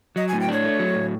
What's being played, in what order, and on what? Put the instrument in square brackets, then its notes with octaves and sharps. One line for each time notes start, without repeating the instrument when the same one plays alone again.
[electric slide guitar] F#3 [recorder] D#5
[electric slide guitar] A2 [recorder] G#5
[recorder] G5
[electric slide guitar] D4 [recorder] C#5
[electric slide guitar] A3
F#3
A2